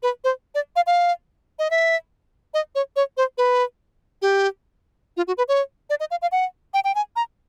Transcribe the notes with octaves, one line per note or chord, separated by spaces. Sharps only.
B4
C5
D5
F5
F5
D#5
E5
D#5
C#5
C#5
C5
B4
G4
F4
F#4
B4
C#5
D5
D#5
F5
F5
F#5
G5
G5
G#5
A#5